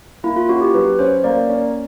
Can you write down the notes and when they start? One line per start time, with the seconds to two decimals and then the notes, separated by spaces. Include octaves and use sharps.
0.23 A#3 E4
0.36 F4
0.49 C#4 F#4
0.61 G4
0.74 F#3 B4
0.99 C#4 C5
1.24 A#3 D5
1.49 C#4